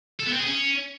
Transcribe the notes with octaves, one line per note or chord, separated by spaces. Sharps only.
A4
B3
C4
G#4
C#4